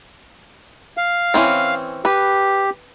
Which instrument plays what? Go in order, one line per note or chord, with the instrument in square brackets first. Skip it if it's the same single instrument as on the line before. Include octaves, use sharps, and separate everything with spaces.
[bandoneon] F5
[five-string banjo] E3 C4 C#4
[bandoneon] G4 [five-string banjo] B4